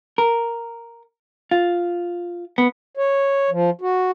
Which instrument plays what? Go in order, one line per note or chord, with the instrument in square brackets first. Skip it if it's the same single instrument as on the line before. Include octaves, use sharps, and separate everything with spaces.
[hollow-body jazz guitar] A#4
F4
B3
[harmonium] C#5
F3
F#4